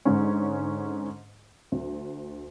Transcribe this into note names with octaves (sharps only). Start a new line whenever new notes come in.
G#2 D3 G#3 C#4
D2